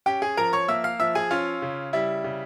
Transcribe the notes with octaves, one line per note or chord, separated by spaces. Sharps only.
C#4 G4 G5
G#4 G#5
F3 A#4 A#5
C#5 C#6
A#3 E5 E6
F5 F6
F3 E5 E6
G#4 G#5
C#4 F4 F5
C#3
G3 E4 E5
C#3